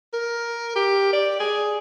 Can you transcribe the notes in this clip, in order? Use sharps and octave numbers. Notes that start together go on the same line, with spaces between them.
A#4
G4
D5
G#4